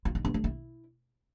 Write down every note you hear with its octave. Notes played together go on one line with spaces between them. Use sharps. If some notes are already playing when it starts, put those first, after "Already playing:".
F4
D#4
B3
A3
E4